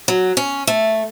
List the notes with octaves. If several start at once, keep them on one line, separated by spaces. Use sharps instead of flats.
F#3
C#4
A3